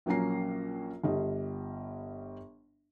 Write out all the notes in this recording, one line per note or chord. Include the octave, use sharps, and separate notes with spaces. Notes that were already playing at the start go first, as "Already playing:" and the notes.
A#1 F#3 A#3 C#4 A#5 C7
G1 G3 D#5